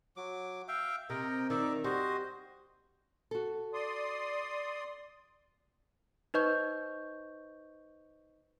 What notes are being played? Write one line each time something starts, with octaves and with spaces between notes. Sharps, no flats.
F#3 D6
E5 F5 G5
C3 A#4 D#5 G5
D#3 D5 E5
G3 F#4 C5 D#5
F#4 A4
D5 C6 D#6
D#4 B4 C5 D#5 C#6 G6